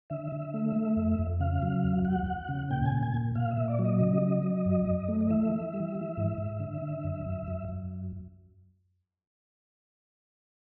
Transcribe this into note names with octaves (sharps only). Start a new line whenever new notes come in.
D3 E5
D3
A3
A3
F2
F2
C#3 F5
F#3
E2
E2 F#5
E2
C#3
A#2 G5
G#5
A#2
G#5
A#2
A#2 F5
E5
A#2
D5
F#3
D#5
C#3
F#3
F#3
F#2
F#2
A3
D#5
E3 E5
E3
G3
E3
G#2
G#2
D3
D3
F#2
F#2
F#2
F#2